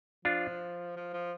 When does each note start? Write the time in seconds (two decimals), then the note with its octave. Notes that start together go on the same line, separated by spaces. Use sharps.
0.25 F3 D4 F4
0.96 F3
1.14 F3